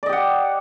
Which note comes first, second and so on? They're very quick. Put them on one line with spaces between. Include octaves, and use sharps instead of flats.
D5 D#5 G4 F#5